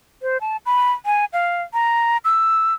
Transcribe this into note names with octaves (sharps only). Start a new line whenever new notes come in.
C5
A5
B5
G#5
F5
A#5
E6